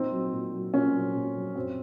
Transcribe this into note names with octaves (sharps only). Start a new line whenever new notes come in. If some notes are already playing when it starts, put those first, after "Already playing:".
Already playing: A#2 C4 D#4
F#3
A#2
F#3
A#2 C#4
F#3
A#2
F#3
F#2 C4